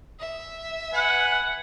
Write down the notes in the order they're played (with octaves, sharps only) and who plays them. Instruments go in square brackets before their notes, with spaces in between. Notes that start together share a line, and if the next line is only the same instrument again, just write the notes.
[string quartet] E5
[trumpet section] B4 G#5 [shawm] F#5